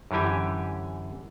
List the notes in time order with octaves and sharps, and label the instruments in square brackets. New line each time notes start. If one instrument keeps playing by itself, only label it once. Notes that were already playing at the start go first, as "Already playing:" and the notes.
[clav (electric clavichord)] F#2 D3 E3 G4 G#5